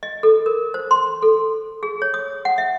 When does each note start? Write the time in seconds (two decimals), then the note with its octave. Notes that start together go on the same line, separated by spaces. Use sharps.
0.03 D#5
0.23 A4
0.46 A#4
0.74 C5
0.91 C6
1.22 A4
1.83 G#4
2.02 C#5
2.14 D#6
2.45 F#5
2.58 E5